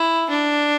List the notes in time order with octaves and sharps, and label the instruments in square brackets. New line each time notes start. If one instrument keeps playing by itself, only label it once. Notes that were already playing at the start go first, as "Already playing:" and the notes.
Already playing: [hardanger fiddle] E4
D4